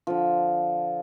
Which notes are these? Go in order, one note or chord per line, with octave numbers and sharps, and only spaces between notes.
D3 F3